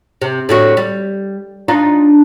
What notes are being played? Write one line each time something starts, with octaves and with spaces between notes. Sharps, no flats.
C3
A2 D3 F#4
G3
D4 D#4 F4